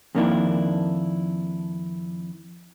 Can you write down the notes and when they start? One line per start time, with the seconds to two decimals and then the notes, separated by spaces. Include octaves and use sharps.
0.15 F2 D#3 A#3 B3 D4 E4